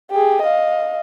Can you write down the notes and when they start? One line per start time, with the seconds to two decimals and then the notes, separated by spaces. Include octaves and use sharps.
0.11 G4 G#4
0.42 D#5 F5